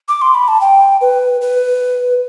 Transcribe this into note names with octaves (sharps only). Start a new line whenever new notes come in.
D6
C6
B5
A5
G5
B4
B4